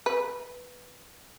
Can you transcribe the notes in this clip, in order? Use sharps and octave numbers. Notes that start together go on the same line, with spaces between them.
B4